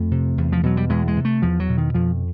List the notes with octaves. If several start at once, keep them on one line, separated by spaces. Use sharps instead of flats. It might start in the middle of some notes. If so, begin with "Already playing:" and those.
Already playing: F2 A3
C3
E2
F3
B2 F#3
G3
E2 G#3
G#3
C3
A3
E2 F3
F#3
B2
D#3
F2 F3